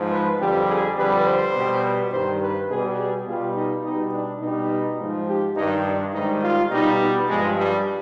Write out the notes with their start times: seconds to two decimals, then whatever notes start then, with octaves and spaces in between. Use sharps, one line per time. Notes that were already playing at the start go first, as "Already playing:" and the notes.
Already playing: G#2 F3
0.11 B4
0.40 F2 D3 G3 G4
0.68 G#4
0.97 F2 D3 G3 B4
1.26 C5
1.54 B2 G3
2.12 G2 D#3 G3 C5
2.40 B4
2.69 B2 G3 G#4
2.97 G#4
3.26 B2 G3 F4
3.55 D#4
3.84 B2 G3 D#4
4.12 D4
4.41 B2 G3 D#4
4.99 G#2 F3
5.28 G4
5.56 G2 D#3 G3 D#4
5.85 D4
6.13 G#2 D#3 G3 D#4
6.42 F4
6.71 B2 G3 D#4
7.00 B3
7.28 G2 F3 G#3
7.57 G3